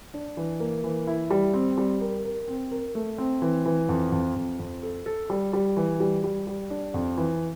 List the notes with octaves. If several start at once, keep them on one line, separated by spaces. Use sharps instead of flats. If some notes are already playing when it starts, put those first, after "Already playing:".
D4
E3
A#3
E3
E4
G3
C4
G3
A#4
A#4
C4
A#4
A3
C4
E3
E3
F2
F2
F2
F2
A4
A4
G3
G3
E3
G3
G3
G3
D4
F2
E3